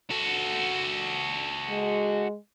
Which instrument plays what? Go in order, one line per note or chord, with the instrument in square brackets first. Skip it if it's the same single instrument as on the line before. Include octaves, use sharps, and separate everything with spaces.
[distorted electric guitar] F#4 A4
[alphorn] G#3